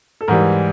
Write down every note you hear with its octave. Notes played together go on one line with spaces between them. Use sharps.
A4
G#2 E3 G3 A#4